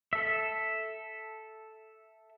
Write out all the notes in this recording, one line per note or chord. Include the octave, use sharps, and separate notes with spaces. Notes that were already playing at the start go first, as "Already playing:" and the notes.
A4 E5